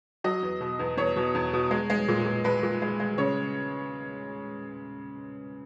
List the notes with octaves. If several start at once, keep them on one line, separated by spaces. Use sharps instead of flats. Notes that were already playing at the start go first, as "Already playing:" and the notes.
F#3 D#5
E2
B2
E2
E2 C#5
B2
E2
B2
G#3
G#3
A#2
A#2
G#3 B4
A#2
G#3
G#3
C#3 C#5